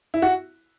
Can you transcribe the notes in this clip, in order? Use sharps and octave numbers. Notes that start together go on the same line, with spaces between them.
E4
F#4